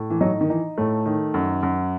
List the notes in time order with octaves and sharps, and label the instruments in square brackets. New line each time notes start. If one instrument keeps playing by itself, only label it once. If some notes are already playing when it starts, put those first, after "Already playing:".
Already playing: [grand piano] A2
[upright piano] E3
[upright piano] F#3 [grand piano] D#4
[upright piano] D#3
[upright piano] E3 [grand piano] D#4
[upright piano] A2 [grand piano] A3
[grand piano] D#3
F#2
F#2